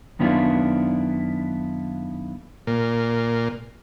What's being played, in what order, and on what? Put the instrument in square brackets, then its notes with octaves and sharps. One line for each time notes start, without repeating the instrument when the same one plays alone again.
[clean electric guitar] F#2 D#3 B3 D4 E4 F4
[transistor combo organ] A#2